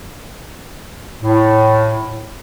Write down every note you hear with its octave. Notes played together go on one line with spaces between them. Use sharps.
A2